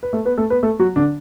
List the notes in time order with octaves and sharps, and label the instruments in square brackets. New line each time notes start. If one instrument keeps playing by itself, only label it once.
[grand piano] B4
A3 A4
B3 B4
A3 A4
B3 B4
A3 A4
F#3 F#4
D3 D4